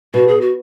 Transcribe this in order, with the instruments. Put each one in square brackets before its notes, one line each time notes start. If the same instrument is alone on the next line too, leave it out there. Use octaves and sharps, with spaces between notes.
[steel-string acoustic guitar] B2 [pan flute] F#4
[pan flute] G#4
F#4